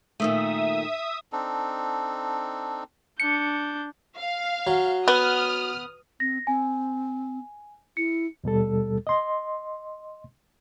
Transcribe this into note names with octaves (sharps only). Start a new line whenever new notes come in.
A#2 D#3 A3 E5 D#6
C4 D4 D#4 A4
D4 G6 C#7
F5
F#3
B3 D#6 F6
C4 A#6
C4 G#5
E4 C#7
D#2 B2 G3 A4
D#5 C6